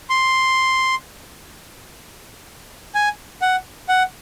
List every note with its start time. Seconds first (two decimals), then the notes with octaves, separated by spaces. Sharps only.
0.10 C6
2.95 G#5
3.42 F#5
3.89 F#5